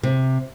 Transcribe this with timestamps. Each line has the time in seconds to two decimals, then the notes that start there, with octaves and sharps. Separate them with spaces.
0.03 C3